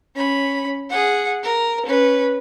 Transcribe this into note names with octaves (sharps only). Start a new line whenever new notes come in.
C#4 B5
G#4 F#5
A#4
C#4 B4